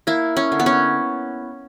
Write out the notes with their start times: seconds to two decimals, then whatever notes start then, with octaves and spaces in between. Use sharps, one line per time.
0.07 A#3 E4
0.37 C#4
0.52 D3
0.59 B3
0.66 C#4